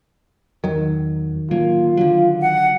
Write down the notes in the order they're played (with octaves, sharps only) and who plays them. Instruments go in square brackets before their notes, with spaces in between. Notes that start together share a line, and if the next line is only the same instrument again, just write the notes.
[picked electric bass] E2 F#3 [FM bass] D#3
[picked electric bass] D1 F#3 A#3 [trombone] F4
[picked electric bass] D3 F#3
[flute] F#5